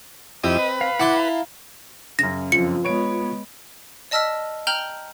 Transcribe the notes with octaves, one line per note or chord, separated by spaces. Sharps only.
F2 C4 E4 G4 D#5
B4
F5
E4 F#5 A5 C6 D6
F5 A#5
F#2 C#3 A#6
F2 F4 C#7
G#3 B3 C#5 D7
D5 D#5 A5 E6 F6 B6
G5 A#5 F6 G6 F#7 G7